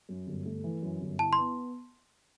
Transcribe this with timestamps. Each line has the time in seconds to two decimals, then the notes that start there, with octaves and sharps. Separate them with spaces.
0.09 F#2
0.27 G1
0.46 A3
0.64 E3
0.83 F#2
1.01 G1
1.19 E4 A5
1.33 C6
1.38 B3